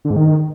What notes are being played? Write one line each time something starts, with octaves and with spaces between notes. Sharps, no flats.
D3
G#2
D#3